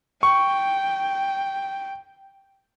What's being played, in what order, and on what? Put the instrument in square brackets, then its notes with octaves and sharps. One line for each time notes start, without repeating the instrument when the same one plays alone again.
[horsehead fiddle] G5 [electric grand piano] C#6